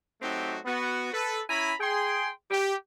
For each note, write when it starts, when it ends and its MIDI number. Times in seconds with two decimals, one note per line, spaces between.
0.22 0.58 54
0.22 0.58 57
0.22 0.58 60
0.22 0.58 63
0.22 0.58 66
0.22 0.58 67
0.65 1.12 59
0.65 1.12 66
1.13 1.42 69
1.13 1.42 71
1.50 1.73 61
1.50 1.73 64
1.50 1.73 80
1.50 1.73 82
1.50 1.73 83
1.80 2.30 68
1.80 2.30 79
1.80 2.30 84
2.51 2.74 67